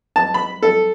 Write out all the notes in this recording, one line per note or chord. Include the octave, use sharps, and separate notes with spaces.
A5
B5
A4